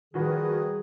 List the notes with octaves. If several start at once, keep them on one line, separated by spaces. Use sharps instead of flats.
D#3 F3 G3 F#4 G#4 B4